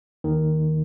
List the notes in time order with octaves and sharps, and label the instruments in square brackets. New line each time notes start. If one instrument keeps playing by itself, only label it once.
[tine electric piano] D#2 D#3